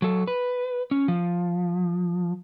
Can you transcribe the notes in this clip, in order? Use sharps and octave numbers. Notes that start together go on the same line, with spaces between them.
F#3 A4
B4
C#4
F3